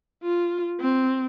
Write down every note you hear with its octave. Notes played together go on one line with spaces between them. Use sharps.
F4
C4